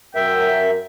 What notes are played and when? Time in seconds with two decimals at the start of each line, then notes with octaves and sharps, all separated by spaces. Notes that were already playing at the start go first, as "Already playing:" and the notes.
0.15 F#2 A#4 E5 G5